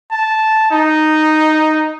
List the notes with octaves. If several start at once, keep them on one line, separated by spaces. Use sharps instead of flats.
A5
D#4